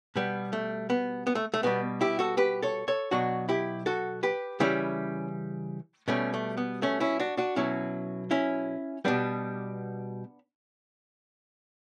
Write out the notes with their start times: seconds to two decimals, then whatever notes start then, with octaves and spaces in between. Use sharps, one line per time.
0.16 B2 G3 B3
0.53 A3
0.90 B3
1.27 B3
1.35 A3
1.54 A3
1.63 B2 G3 B3
2.01 E4 G4
2.19 F#4 A4
2.37 G4 B4
2.62 A4 C#5
2.88 A4 C#5
3.11 B2 F#3 D4 F#4
3.49 E4 G4
3.86 F#4 A4
4.23 G4 B4
4.60 C#3 E3 G3 C#4 E4
6.08 B2 G3 A3 C#4
6.34 A3
6.57 B3
6.82 A3 C#4
7.00 C#4 E4
7.20 D4 F#4
7.37 D4 F#4
7.56 B2 F#3 C#4 E4
8.31 C#4 E4
9.05 B2 G3 B3 D4